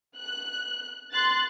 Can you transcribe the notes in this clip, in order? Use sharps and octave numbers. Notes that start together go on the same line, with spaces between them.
F#6
C6 F#6 A6